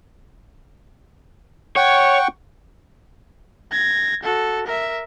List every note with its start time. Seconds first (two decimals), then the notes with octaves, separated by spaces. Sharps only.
1.76 C#5 F#5 G5 C#6
3.72 G#6 A#6
4.23 F#4 A4
4.67 A#4 E5